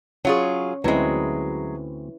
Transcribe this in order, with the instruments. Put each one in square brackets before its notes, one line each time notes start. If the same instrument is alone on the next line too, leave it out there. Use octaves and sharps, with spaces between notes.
[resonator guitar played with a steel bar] F#3 F4 G#4 [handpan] C#4 C#5
[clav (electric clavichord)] D2 C4 C#4 [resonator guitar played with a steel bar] F#3 G#3 [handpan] E4 B4